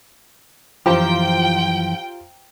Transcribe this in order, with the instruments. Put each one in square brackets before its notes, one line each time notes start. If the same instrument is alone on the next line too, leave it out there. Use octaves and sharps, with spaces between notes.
[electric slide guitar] F#2 E3 F3 [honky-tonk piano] F4 C5 A#5 [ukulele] G4 [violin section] G5